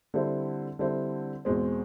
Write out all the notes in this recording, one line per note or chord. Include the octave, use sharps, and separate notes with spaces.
D3 G3 C4 E4
D3 G3 C4 E4
E2 B2 G#3 C4